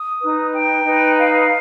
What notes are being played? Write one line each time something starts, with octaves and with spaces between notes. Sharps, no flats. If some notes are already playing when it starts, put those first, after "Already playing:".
Already playing: D#6
D#4 B4
G5
D#4 B4
F5